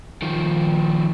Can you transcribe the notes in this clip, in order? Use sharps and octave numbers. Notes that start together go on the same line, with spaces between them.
D#3 F3